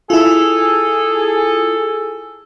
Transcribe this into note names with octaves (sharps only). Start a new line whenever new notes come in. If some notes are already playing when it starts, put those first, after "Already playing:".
E4 F4 G#4 A4